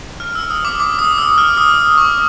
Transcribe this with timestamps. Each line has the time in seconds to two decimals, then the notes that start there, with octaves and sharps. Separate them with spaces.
0.20 F6
0.35 E6
0.50 D#6
0.65 D6
0.80 D6
0.99 D#6
1.18 E6
1.38 F6
1.57 D#6
1.98 C#6